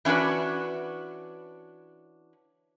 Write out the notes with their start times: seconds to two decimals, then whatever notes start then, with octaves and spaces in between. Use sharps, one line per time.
0.05 E3 C#4 D4 F#4 B4